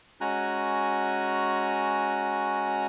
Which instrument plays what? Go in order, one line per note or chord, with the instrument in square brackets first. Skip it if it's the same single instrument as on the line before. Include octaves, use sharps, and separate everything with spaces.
[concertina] G#3 C#4 F#4 G#5 A#5 F#6